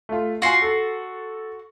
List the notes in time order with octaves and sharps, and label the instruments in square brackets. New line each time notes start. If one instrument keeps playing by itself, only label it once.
[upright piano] A3 F4
[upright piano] F4 G#5 [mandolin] F#4 C6
[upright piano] A4